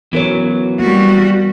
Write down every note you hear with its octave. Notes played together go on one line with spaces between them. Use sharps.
E3 F#3 B3 A#4 C#5
G3 A#3 F#4